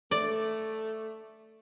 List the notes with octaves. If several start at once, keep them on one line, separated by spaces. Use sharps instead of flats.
A3 D5